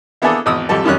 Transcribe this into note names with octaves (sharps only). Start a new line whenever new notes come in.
A#3 B3 D4 E4 G#4 A4
G#1 E2 D#6 E6
G#1 F2 G3 A4
F#2 D#3 G3 C#4 F#6